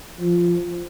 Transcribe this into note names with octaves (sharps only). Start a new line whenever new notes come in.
F3